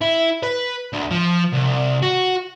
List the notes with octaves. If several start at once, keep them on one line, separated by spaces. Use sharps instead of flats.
E4
B4
D2
F3
C2
F#4